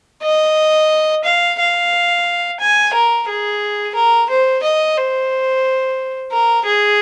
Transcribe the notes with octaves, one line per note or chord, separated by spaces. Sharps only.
D#5
F5
F5
G#5
A#4
G#4
A#4
C5
D#5
C5
A#4
G#4